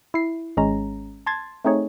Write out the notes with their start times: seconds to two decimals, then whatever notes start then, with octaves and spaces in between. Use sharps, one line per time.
0.14 E4 C7
0.57 G#1 G#3 C#4 A#5
1.26 A5 C6 G#6 A6
1.65 A3 C4 D#4 G#4 C#5